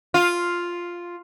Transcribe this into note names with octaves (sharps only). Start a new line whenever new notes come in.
F4